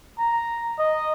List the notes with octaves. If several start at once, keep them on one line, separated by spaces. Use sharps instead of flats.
A#5
D#5